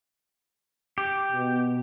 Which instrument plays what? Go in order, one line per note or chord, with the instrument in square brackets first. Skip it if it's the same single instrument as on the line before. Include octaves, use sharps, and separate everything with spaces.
[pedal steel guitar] G4
[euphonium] B2